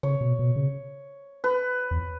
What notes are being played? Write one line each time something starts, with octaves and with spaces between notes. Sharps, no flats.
C#3 C#5
B2
B2
C#3
B4
E2